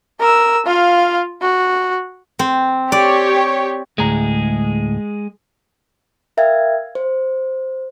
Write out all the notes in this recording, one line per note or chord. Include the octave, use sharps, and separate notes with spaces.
A#4 E6
F4 F5
F#4
C4
G4 C#5 D5
D2 A2 G#3 G#4 A#5
A#4 E5 F5 G5 G#6
C5